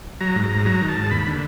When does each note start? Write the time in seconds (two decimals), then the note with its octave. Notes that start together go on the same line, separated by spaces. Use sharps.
0.21 F#3 A#5
0.36 G#2
0.43 A#5
0.50 G#2
0.65 F#3 A#5
0.81 D#3
0.88 A5
0.95 G#2
1.11 D#2 B5
1.26 D3